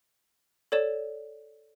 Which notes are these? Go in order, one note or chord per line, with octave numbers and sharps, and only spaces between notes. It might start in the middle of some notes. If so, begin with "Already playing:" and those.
A4 C#5 D5 E7